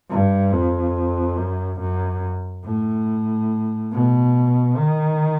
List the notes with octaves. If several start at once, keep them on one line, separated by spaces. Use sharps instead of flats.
G2
F2
F#2
F#2
A2
B2
D#3